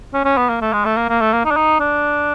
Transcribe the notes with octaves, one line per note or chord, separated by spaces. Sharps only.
C#4
C#4
B3
A#3
A3
G#3
A3
A#3
A#3
A3
A#3
D#4
D4
D#4
D4